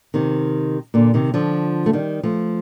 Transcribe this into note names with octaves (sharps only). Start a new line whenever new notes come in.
C3 D#3
A#2 D3
C3 D#3
D3 F3
A3
D#3 G3
F3 A3